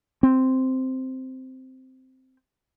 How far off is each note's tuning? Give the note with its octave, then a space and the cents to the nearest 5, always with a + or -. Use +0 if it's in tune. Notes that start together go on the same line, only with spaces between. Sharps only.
C4 -5